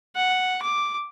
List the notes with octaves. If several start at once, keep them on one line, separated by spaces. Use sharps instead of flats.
F#5
D6